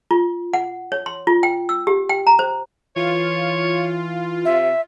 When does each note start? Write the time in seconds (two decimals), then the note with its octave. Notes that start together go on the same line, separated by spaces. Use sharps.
0.11 F4
0.53 F#5
0.92 C#5
1.06 C6
1.27 F4
1.43 G5
1.69 E6
1.87 G4
2.09 G5
2.27 A#5
2.39 C5
2.96 E3 F4 C#5
4.45 C3 E5